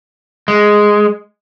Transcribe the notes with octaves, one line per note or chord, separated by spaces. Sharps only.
G#3